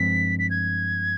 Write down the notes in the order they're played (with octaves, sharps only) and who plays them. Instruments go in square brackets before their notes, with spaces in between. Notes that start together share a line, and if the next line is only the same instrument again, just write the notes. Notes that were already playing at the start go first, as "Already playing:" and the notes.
Already playing: [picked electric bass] G2 F3 G#3 C4 [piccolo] B6
[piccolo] B6
G#6